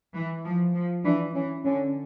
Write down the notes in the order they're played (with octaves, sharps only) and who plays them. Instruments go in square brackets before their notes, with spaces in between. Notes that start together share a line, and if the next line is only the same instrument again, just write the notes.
[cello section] E3
F3
F3
[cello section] E3 [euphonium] D4
[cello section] E3 [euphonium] C#4
[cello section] D3 [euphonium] C#4